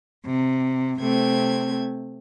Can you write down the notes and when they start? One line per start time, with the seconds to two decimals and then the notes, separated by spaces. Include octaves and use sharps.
0.25 C3
1.01 C3 A3 C4 G#6